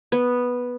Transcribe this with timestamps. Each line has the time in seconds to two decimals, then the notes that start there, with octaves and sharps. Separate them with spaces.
0.12 B3